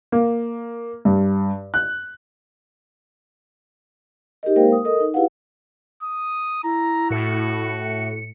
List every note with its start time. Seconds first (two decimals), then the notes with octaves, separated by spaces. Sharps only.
0.12 A#3
1.05 G2
1.74 F#6
4.43 D#4 G4 G#4 A#4 D#5
4.56 G#3 A#3 A#4 C5 F5 G5
4.72 D#6
4.85 A4 A#4 D#5 D#6
5.00 D#4
5.14 E4 G4 G#4 B4 F5 F#5
6.03 D#6
6.64 E4 A#5
7.10 A2 F#4 C#7